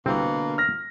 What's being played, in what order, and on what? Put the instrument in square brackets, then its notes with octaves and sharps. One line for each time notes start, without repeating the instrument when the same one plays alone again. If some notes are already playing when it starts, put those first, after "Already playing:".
[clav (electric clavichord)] C2 C4 [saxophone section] B2 A#3 [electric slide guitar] D3
[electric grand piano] F6 A#6